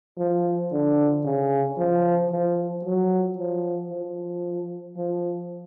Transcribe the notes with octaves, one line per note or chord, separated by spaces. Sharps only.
F3
D3
C#3
F3
F3
F#3
F3
F3
F3